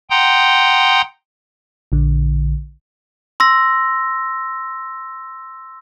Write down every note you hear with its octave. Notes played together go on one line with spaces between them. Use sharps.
F#5 G5 A#5 C6 D#6 G6
A#1 D3
C6 E6 A#6